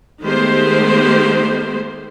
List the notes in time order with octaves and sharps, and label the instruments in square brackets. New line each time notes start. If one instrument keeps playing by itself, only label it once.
[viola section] D#3 G#3 A3 B3 G4 C5